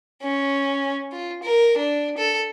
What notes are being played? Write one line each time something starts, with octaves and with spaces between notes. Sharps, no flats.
C#4
F4
A#4
D4
A4